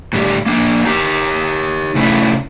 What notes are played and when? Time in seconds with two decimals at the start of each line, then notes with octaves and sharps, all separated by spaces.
0.13 A2 D3 G3 G4
0.46 A#3 D4
0.85 D#4 G4
1.95 C3 A3 C#4 E4